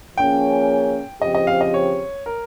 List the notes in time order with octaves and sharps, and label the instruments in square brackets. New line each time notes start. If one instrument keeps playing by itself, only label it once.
[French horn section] F3 A#3 C#4 G#4 [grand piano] G5
[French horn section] C#3 F3 C4 G4 [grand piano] D#5
[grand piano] D#5
F5
D#5
C#5
A#4